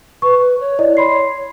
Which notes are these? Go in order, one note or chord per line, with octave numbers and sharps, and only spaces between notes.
B4 C#6
C#5
E4 D5 D#5
B5 C6 C7